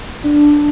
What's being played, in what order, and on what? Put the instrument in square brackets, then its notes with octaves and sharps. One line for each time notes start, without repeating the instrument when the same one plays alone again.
[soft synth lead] D4